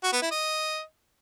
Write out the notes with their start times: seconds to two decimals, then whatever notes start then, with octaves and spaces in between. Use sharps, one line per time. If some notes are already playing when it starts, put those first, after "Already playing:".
0.03 F#4
0.13 B3
0.22 E4
0.31 D#5